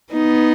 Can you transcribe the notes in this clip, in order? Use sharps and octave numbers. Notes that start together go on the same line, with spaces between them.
B3 D#4